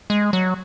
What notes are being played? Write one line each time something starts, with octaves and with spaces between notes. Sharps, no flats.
G#3
F#3